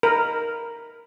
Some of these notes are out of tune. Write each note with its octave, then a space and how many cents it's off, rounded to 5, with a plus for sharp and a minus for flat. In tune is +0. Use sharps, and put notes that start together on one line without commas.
A#4 +0 B5 +0